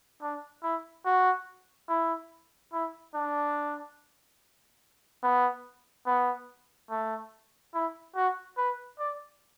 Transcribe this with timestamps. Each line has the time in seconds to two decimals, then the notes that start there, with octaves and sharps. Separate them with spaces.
0.22 D4
0.63 E4
1.05 F#4
1.88 E4
2.73 E4
3.14 D4
5.23 B3
6.07 B3
6.90 A3
7.74 E4
8.16 F#4
8.57 B4
8.99 D5